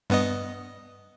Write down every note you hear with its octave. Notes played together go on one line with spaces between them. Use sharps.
G2 B3 D#5